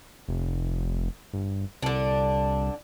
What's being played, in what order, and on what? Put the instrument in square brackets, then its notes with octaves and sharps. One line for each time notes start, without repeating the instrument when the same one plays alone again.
[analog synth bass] F1
G1
[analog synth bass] C2 [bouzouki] D3 D4